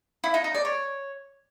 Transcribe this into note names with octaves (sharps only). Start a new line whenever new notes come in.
E4
D#4
D#4
D5
C#5